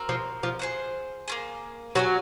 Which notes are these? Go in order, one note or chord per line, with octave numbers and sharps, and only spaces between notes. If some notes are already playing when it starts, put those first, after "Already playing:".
Already playing: C4 F#4 A#4
F3
F3
G#4 C5 F#5
A#3 F4 G#4
F#3 C#4 F#4 C#5 G#5